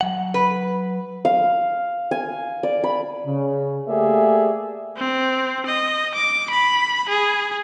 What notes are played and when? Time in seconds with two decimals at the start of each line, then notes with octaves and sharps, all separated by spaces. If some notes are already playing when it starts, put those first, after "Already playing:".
0.01 F#3 F#5
0.34 B4
1.25 F5
2.11 G#5
2.63 D5
2.84 B5
3.25 C#3
3.88 A3 A#3 G4 G#4 D5 E5
4.97 C4
5.66 D#5
6.15 D6
6.50 B5
7.09 G#4